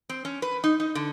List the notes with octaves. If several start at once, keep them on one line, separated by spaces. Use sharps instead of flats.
C4
C#4
B4
D#4
D#4
D3